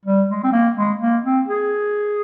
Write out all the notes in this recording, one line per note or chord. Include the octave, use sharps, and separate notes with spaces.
G3
G#3
C4
A#3
G#3
A#3
C4
G#4